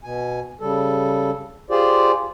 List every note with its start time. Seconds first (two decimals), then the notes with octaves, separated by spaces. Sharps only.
0.04 B2 G#5
0.61 C#3 G3 A4
1.70 F4 G4 G#4 C5 D5